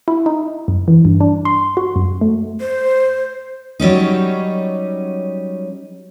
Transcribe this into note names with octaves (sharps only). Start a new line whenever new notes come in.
E4
D#4
F#2
E3
G2
D4
C6
F#4
F#2
A3
C5
F#3 G3 C#4 D#4